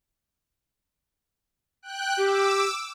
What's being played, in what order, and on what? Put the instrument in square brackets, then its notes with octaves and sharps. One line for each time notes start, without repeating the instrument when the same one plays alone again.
[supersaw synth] G5 F#6
[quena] G4 [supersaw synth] D6 E6